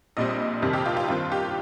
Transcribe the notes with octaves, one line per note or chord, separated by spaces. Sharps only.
A#1 A#2 G3 C4 D#5
F2 C3 D#3 G3 C4
G4
F4
F4
G2 D#3 C4 F4
G4